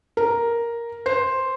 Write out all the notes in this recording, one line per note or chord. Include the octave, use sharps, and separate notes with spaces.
A#4
C5